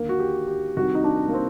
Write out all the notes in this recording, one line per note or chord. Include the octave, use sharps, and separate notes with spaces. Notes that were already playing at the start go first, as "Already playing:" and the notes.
Already playing: D#2 D3 A#3
F#4
G4
G4
C2 C3 D#3 F#4
D#4
D4
A#3
C4